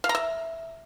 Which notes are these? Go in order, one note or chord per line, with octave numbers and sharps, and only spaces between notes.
F5
A#5
E5